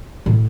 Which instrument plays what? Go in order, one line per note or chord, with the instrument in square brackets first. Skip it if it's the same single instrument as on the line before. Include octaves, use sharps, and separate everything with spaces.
[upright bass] A2